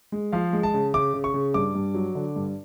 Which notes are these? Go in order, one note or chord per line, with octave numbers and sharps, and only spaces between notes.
G#3
F3 F5
G#3
A5
C#3
C#3 D6
C#3
C#6
C#3
G2 D6
G2
F#3
D3
G2